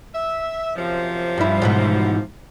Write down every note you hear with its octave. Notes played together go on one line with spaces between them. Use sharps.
E5
F#2 C3 F3
G2 E4
G#2 B2 E3